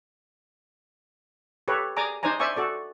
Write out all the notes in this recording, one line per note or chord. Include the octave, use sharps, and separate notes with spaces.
G4 A4 B4 C#5
G#4 D5 G#5 A#5 D6
D4 D#4 C5 D5 G#5 A#5
C5 D5 E5 G#5 C#6
F#4 A4 D5